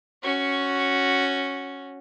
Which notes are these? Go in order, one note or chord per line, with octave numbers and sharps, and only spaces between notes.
C#4 F#4